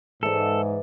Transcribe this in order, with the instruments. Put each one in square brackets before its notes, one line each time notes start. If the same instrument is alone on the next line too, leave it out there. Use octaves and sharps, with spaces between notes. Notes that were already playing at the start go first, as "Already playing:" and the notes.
[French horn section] G#2 [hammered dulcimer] E3 D5 [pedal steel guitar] A4